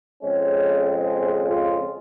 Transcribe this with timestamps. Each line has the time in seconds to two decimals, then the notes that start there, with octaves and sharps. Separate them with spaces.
0.23 F2 C#3 G#3 C4 C#4
1.48 F4